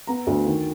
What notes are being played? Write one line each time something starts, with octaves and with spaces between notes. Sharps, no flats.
B3 A#5
D2
D#3